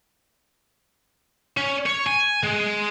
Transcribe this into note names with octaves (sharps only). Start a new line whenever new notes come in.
C#4
C#5
G#5
G#3